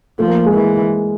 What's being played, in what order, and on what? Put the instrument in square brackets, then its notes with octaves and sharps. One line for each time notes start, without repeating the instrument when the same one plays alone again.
[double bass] F3 [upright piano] A3
[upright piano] A#3
G#3
[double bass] E3